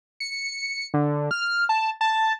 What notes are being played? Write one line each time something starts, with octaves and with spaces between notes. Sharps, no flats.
C#7
D3
F6
A5
A5